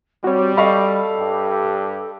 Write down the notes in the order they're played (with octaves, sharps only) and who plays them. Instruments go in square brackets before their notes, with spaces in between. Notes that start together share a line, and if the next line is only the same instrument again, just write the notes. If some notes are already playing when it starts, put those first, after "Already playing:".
[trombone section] G3 [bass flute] C4 [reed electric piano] F#4 C#5
[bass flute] A4 [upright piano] D#5 F5 C#6 [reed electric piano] B5
[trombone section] G2 G4